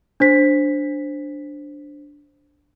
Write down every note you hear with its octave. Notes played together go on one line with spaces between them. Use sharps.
D4 C5 B6